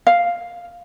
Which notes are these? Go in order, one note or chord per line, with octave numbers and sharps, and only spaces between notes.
F5